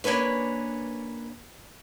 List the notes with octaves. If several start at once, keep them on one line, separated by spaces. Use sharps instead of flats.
A#3 C#4 D4 B4 C#5